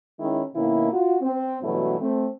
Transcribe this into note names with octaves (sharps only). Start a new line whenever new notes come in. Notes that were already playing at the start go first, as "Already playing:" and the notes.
D#3 G#3 C#4 E4
B2 D#3 A#3 C#4 E4
F4 F#4
C4
G2 B2 E3 F#3 A3 E4
A3 C4